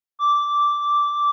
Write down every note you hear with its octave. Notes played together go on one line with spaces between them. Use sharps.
D6